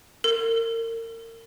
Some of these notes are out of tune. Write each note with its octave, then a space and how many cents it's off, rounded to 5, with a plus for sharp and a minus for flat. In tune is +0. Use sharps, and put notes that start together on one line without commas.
A#4 -35